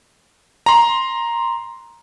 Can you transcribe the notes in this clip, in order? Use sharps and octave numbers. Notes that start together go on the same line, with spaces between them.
A#5 C6